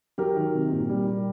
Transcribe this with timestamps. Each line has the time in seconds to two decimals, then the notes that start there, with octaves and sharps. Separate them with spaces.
0.18 F#3 G4 A#4
0.36 D#3
0.54 C3
0.72 A#2
0.89 G3
1.07 G3